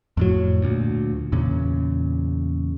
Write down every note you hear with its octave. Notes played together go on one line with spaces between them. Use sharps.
F2 A2 F#3
D2 A#2
E2 A#2 C#3